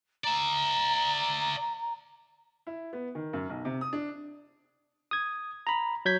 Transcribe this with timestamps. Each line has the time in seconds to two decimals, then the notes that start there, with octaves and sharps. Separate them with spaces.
0.24 D5 E5 A#5
2.67 E4
2.93 B3
3.15 D#3
3.33 F#2
3.50 B1
3.65 C3
3.81 D#6
3.93 D4
5.11 D#6 G#6
5.67 A#5 B5
6.05 F#3 G6 G#6 B6